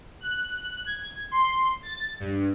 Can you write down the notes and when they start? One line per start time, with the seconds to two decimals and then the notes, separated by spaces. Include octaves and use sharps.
0.21 F#6
0.86 G#6
1.31 C6
1.83 A6
2.20 G2